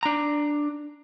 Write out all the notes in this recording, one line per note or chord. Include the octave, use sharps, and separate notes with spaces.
D4 A#5